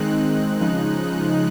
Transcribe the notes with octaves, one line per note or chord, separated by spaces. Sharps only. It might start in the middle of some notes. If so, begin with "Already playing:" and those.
Already playing: D#3 G#3 C4 D#4 F#6
C#3 F3 G#3 D#4 F#6